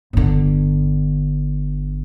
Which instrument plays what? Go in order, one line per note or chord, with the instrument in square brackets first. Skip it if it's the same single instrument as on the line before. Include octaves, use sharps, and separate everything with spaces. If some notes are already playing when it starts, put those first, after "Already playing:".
[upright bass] G1 D3